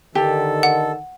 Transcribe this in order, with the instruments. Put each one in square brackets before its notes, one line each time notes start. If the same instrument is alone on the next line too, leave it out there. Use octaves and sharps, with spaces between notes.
[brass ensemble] D3 D#3 [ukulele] G4 [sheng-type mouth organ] A4
[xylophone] F#5